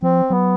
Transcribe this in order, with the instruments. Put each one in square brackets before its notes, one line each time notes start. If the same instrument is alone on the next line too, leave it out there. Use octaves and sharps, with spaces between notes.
[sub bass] F3 [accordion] C4
[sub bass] F#3 [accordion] B3